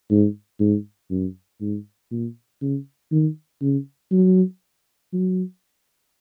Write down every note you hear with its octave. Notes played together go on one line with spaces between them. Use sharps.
G#2
G#2
F#2
G#2
A#2
C#3
D#3
C#3
F#3
F#3